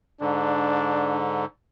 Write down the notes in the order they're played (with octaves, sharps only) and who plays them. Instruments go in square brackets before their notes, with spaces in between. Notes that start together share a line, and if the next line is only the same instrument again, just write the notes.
[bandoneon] G#2 D3 [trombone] D4